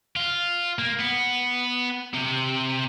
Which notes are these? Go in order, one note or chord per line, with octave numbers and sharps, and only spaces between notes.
F4
A#3
B3
C3